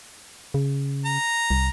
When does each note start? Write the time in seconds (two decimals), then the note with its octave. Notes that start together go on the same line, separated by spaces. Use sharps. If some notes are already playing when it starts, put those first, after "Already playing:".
0.54 C#3
1.05 A#5
1.50 C2